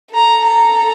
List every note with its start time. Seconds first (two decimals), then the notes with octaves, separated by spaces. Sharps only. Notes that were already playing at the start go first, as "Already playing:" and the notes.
0.14 A4 A#5
0.46 A#5